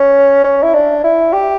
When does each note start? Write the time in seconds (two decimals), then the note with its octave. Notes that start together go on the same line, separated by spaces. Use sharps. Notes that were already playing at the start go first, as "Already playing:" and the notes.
Already playing: C#4
0.44 C#4
0.63 E4
0.74 D4
1.04 E4
1.33 G4